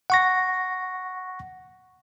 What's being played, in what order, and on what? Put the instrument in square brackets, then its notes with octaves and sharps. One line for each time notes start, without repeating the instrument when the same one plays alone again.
[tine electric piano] F#5 C#6 A#6